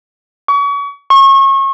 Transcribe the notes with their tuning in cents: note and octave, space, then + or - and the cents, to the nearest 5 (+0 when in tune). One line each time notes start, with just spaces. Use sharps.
C#6 +35
C#6 -30